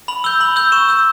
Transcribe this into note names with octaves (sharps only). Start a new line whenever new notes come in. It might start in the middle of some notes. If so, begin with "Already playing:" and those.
B5 F#7
E6 G6 G7
B5 F#7
E6 G6
C#6 E7
E6 G6